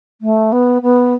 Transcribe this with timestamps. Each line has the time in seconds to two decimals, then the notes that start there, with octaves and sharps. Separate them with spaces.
0.21 A3
0.52 B3
0.82 B3